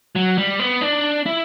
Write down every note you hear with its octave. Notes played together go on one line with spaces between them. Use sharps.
F#3
G3
B3
D4
E4